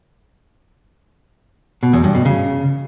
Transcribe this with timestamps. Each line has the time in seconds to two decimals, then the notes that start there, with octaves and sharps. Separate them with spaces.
1.83 B2
1.93 E2
2.04 G2
2.15 B2
2.25 C#3